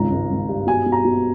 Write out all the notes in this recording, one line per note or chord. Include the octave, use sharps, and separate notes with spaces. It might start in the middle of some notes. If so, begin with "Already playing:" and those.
Already playing: G#1 C#2 A#5
G#1
G#1
G2
B2 G#5
B2
A#5
B2